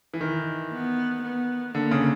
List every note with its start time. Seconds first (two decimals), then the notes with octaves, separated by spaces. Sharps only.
0.14 E3
0.21 D#3
0.72 B3
1.23 B3
1.75 D3 A#3
1.91 C#3